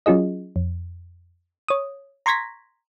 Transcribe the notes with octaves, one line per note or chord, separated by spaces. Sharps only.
F#3 C#4 F4 G#4 D#5
F2
C#5 D#6
A#5 C6 C#6 G#6 A#6 B6